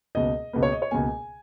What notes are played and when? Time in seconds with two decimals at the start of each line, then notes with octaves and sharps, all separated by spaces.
0.15 C#2 B2 A#3 D#5
0.53 C#2 B2 A#3 B4
0.63 C#5
0.72 D#5
0.82 C#5
0.91 C#2 B2 A#3 G#5